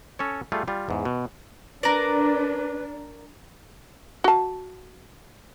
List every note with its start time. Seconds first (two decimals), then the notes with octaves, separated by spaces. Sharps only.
0.19 C#4 A4 C#5
0.52 G3 A3 F4 G#4
0.68 G3 F4
0.89 E2 G#2
1.05 B2
1.83 D4 A#4 B4 D5
4.24 F#4 A5